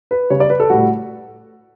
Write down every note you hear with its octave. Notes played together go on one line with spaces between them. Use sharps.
B4
C#3 G3 C#5
D5
B4
A4
A2 G3 F#4